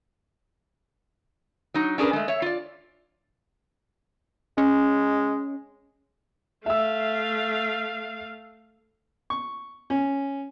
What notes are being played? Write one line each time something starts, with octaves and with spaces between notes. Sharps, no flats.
F#3 D#4
C#4 D4 G#4 A#4 B4
G#3 A3
C#5 E5
F4 D5
G#3 C#4
A3 E5 F5 E6
C#6
C#4